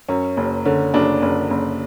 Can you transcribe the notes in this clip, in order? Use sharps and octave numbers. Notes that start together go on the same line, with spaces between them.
F#2 C#4
F#1
D3 C#4
F#1 D4
F#1
F#1